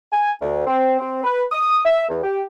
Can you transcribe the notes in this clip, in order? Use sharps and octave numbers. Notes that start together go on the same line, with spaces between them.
G#5
D2
C4
C4
B4
D#6
E5
E2
G4